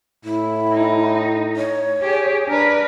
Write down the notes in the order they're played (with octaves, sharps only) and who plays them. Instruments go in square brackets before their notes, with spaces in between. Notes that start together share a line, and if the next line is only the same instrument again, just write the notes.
[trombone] A2 [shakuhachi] E4
[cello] D#4
[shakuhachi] C#5
[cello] G4 G#4
[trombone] D4 [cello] A#4 B4